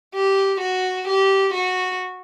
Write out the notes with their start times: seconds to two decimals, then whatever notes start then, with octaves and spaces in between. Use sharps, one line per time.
0.15 G4
0.61 F#4
1.08 G4
1.54 F#4